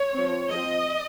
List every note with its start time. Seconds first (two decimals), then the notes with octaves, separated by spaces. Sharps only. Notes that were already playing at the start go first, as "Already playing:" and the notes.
Already playing: C#5
0.14 F3 C4
0.51 F3 C4 D#5